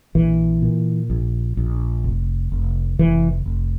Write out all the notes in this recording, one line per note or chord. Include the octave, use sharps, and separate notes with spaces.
A#1 E3
A#2
A#1
A#1
F1
F1
F1 E3
F1